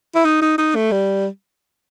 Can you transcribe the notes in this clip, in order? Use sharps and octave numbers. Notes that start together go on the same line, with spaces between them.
E4
D#4
D#4
D#4
A3
G3